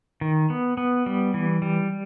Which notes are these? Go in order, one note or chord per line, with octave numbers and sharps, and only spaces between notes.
D#3
B3
B3
G3
E3
G3